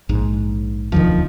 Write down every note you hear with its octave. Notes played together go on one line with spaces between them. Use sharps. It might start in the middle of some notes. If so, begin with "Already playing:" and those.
A#1 G#2
E1 D2 D#3 F3